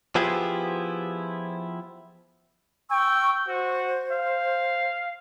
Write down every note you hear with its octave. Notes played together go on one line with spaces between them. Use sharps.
F3 B3 E4 F4 G4 G#4
G5 C#6 E6
F#4 C5
F5